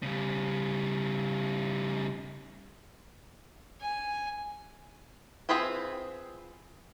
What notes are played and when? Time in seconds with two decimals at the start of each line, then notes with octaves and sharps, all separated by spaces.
0.03 C#3 G3
3.81 G#5
5.49 C4 F4 G#4 B4 G5